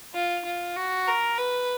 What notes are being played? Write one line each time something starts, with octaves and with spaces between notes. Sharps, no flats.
F4
F4
F#4
A#4
B4